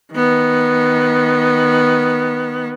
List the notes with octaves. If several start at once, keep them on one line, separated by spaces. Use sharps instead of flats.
D#3 B3